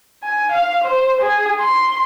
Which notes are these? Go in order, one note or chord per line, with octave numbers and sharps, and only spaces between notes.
G#5
F5
C5
G#4
C6